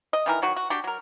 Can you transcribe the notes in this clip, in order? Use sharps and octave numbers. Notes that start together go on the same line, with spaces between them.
D#5
D#3 E3 A#4
D#3 F#3 F#4
F#4
D4 F#4 G4
F#3 A#4